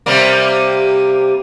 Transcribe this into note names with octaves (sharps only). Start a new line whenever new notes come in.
C3 G3 A#3